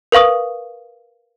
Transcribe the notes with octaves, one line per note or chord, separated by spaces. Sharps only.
A#4 B4 F5 C#6 D#6